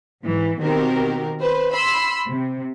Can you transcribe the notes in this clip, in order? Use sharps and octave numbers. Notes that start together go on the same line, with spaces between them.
G#2 E3
B2 D#3 C4 F#4 G4 A#4
B4 C5
B5 C6 E6
C3